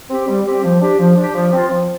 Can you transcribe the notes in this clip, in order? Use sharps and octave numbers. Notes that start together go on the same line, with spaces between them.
C4 G4
G3
C4 G4
F3
D4 G4
F3
D4 G4
F3
C4 F4
F3